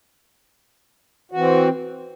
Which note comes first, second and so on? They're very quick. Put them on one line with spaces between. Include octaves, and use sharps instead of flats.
F#4 E3 C4